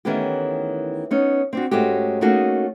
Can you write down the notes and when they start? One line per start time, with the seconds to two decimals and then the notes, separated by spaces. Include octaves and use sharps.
0.05 D#3 E3 A3 B3 C#4 G4
1.11 B3 C#4 D#4
1.53 C4 D4 F#4
1.71 G#2 G#3 A3 C#4 F#4 G4
2.21 A3 A#3 C#4 D#4 F#4 G#4